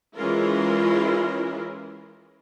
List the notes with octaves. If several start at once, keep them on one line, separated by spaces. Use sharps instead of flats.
E3 G#3 C#4 E4 F4 A#4